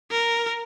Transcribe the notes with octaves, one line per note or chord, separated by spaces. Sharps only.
A#4